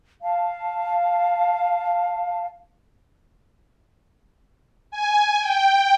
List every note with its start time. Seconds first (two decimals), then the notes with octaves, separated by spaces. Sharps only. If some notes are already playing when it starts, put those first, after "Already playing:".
0.22 F5 A5
4.91 G#5
5.40 G5